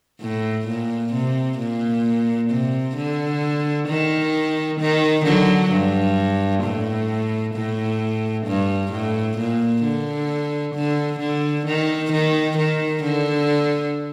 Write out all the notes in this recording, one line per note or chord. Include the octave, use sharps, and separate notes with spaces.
A2
A#2
C3
A#2
C3
D3
D#3
D#3
D3 F#3
G2
A2
A2
G2
A2
A#2
D3
D3
D3
D#3
D#3
D#3
D3